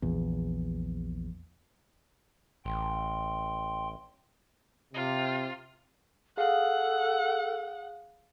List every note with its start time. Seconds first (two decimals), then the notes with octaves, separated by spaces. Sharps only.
0.02 A#1 E2
2.65 A1 G5 C6
4.94 C3 F4
6.37 G#4 A4 F5 F#5